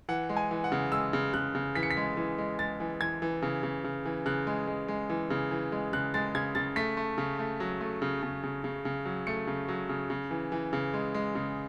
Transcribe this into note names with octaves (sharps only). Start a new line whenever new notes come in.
E3 F#5
G#3
G#5
E3
F#5
C#3
G#3 E6
C#3
C#3 F#6
C#3
E3 B6
C#7
B6
G#3
E3
G#3
G#3 A6
E3
E3 G#6
E3
C#3
C#3
C#3
E3
C#3 F#6
G#3
G#3
G#3
E3
C#3
E3
G#3
C#3 F#6
G#3 A6
C#3 G#6
C#3 A6
A3 B6
A3
C#3
A3
F#3
A3
C#3
C#3
C#3
C#3
C#3
F#3
A3 C#7
C#3
F#3
C#3
C#3
E3
E3
C#3
G#3
G#3
C#3